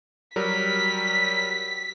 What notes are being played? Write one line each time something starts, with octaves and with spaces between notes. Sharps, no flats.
F#3 G3 A#4 B6